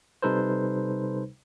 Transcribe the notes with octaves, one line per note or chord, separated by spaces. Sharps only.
C3 G3 D#4 A4 B4 C5